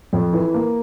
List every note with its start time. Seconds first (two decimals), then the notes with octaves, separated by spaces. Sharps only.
0.13 F2
0.33 E3
0.54 A#3